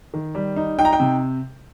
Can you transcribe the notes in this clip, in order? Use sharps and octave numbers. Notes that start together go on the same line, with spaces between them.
D#3
G3
D#4
D#4 G5
A#5
G5
C3